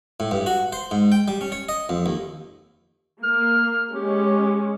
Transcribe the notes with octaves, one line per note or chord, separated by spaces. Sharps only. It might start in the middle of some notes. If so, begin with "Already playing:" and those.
A2
G2
F#4
C5
G#2
G5
G3
C#4
C#5
D#5
F2
D#2
A#3 F6
G#3 C#4 G4